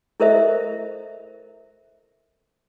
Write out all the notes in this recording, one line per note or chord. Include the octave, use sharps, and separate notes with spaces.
E4 A4 A#4 C5 D#5 E5